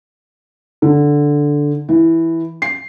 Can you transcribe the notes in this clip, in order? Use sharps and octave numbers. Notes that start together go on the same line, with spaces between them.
D3
E3
C7